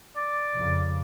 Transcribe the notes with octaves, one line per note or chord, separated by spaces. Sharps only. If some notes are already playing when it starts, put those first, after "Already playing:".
D5
F2 C#3